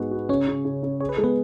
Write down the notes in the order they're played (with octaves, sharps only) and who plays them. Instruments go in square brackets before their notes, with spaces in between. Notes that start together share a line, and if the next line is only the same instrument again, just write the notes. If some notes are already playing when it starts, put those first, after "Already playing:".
Already playing: [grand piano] G#2 G#3 F#4 [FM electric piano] B3 B4
[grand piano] F#4
[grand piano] C#3 [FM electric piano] C#4 C#5
[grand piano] C#3
C#3
C#3
[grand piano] G#4 [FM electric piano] C#5
[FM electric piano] B4
[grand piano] G#3 [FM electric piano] A4
[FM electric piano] B3 B4